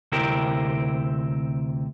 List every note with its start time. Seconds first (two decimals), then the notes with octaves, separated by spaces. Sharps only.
0.12 D2 C3 C4 E4 G4 A#4